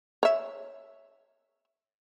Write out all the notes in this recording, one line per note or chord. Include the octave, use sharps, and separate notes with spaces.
C#5 E5